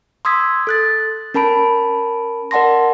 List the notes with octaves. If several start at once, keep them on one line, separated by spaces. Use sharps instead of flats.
C6 D#6 E6 G#6 B6
A4 F#6 A6
C#4 A#4 A5 B5 D7
A#4 D5 F#5 A5 C6 A#6